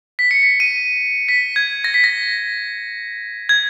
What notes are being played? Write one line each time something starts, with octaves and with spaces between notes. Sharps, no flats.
B6
C#7
B6
D#7
B6
G#6
A#6
B6
A#6
G#6